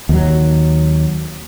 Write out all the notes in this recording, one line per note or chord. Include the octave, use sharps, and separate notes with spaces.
D#2 F#3